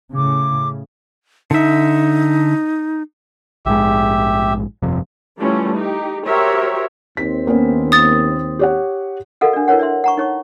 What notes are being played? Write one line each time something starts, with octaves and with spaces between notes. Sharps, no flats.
A2 C#3 D6
D3 D#4 E5
A#1 G#2 G#3 G4 E5
G1 F2 C3
E3 G3 A3 C#4 F4
D#4 G4
F#4 G4 A#4 C5 C#5 E5
D#2 C4 B6
A#3 B3 C#4
D#6 A6
G4 C#5 F#5
F#4 A4 A#4 D#5 F5 F#5
D4 D5
E4 A#4 B4 C#5 F#5
D5 E5 C6
F#5 A#5 C#6
D#4 C#5 C#6